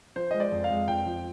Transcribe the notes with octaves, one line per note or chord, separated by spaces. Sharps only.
F3 C5
G#3 D#5
D5
F2
F5
G#3
F2 G5
F3